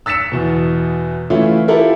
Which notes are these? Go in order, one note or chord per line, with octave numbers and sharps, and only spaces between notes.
E6 A6 B6 C#7 E7
E2 B2
E3 A3 C#4 E4 F4
E4 F4 G4 A4 A#4